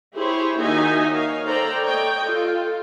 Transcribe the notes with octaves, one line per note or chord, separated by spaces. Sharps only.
E4 G4 G#4 C5 C#5
D#3 A#3 D#4 F#4 E5 G#5
C#5 F5
A4 C5 D5 G5 A#5
A4 C#5 D#5 G5
F4 A4